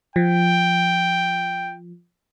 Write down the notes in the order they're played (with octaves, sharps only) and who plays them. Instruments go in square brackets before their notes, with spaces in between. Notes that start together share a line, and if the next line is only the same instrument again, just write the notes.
[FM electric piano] F3 [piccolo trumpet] G5